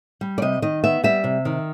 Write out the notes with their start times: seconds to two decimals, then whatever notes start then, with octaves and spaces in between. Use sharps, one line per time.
0.21 G3
0.38 D5
0.42 C3 D#5
0.62 D#3 D#5
0.84 B3 E5
1.03 G3 E5
1.24 C3
1.45 D#3